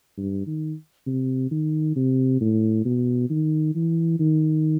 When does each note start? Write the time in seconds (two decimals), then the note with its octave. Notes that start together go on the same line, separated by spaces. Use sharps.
0.17 G2
0.47 D#3
1.06 C3
1.51 D#3
1.96 C3
2.41 A2
2.85 B2
3.30 D#3
3.75 E3
4.19 D#3